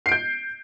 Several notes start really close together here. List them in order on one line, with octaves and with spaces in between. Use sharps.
C7 D7 G6